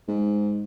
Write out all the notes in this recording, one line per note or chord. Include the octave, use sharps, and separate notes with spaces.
G#2